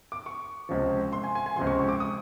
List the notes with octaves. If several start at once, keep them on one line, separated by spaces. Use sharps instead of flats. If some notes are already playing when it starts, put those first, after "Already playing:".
D6
C#6
C#2 C3 F3
C6
G#5
G#5
G#5
C#2 C3 F3 C6
C#6
C#6
D6
D#6